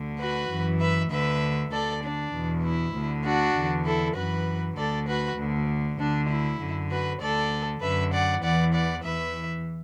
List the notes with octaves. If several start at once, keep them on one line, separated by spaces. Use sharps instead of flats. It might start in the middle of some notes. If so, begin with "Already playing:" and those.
Already playing: D2 D3
F#4 B4
F#2 E3
B4 E5
D2 D3 B4 E5
D2 D3 A4 D5
D4
E2 B2
E4
D2
D3
D4 F#4
E2 D3
E4 A4
F#2 E3 F#4 B4
D2 D3 A4 D5
F#4 B4
D2 D3
D2 D3 D4
E4
F#2 D3
F#4 B4
D2 D3 A4 D5
F#2 D3 B4 E5
D5 F#5
E2 E3 D5 F#5
D5 F#5
E2 E3 B4 E5